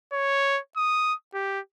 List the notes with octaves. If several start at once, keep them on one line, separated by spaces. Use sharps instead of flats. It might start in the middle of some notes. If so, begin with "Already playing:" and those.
C#5
D#6
G4